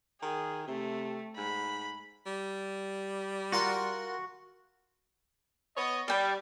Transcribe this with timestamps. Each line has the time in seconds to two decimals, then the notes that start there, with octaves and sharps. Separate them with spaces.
0.22 D#3 G#4
0.68 C3 A3
1.37 G#2 B5
2.26 G3
3.52 F4 F#4 A#4 F#5 C6
5.77 B3 C#5 D#5
6.08 G3 D5 G5